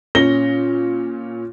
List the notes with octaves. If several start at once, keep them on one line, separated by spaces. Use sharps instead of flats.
A#2 C#4 A#6 G7